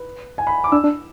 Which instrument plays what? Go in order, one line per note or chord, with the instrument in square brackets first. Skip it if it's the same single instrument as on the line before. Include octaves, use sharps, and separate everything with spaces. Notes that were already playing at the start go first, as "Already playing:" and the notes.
Already playing: [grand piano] B4
G#5
B5
D6
[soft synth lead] D4 [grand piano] E6
[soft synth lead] D4